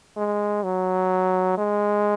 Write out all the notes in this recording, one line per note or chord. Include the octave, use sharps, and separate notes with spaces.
G#3
F#3
G#3